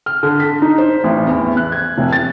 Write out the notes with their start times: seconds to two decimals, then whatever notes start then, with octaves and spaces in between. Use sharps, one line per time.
0.06 F6
0.23 D3
0.40 B6
0.62 D#4
0.78 C5
1.04 A1
1.27 E2
1.57 F#6
1.72 G#6
1.98 F1
2.12 A6